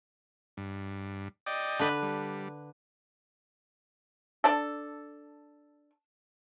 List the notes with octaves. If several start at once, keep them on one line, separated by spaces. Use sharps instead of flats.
G2
D5 D#5 G5
D3 B4
G3
D4 A4